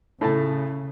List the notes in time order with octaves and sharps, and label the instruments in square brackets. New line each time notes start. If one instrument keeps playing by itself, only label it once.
[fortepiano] A2 A3 A5 [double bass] C#3